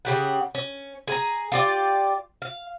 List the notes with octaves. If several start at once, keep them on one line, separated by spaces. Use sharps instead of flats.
C#3 G4 F#5
C#4
G#4 G#5 A#5
F4 G4 D5
F5